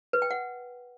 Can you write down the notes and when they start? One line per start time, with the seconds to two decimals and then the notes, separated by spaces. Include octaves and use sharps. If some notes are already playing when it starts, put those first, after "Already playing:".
0.13 B4
0.22 G5
0.31 F#5